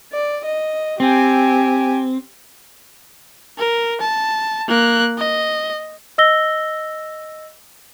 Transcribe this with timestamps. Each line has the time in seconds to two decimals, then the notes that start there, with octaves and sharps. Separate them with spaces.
0.13 D5
0.45 D#5
1.00 C4 G4 G#5
3.58 A#4
4.01 A5
4.68 A#3 F#6
5.18 D#5
6.18 D#5 E6 A#6 G7